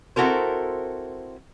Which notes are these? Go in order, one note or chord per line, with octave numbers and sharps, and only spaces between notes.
C4 E4 F#4 A4 A#4 C5